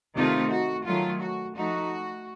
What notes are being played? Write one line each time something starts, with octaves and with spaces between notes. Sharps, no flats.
C3 D#3 A3 D#4 F4
F#4
D#3 F#3 A3 F4
F#4
F3 A3 D#4 F#4